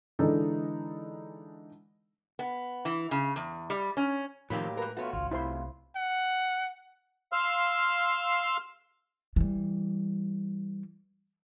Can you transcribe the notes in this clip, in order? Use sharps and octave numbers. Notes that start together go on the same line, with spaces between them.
D3 E3 G#3 D4 D#4 A4
B3
E3
C#3
E2
G3
C#4
A2 C3 D#3 F3 F#3 A#3 G4 B5
G#2 A#4 B4
A3 B3 F4 F#4 C#5
G#1 C#2 F4
C2 A2 C3 E4 F4 C5 C6
F#5
F5 C6 E6 F6
E3 G3